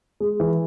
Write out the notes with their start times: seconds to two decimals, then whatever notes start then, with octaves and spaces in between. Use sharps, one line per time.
0.20 G#3
0.40 E3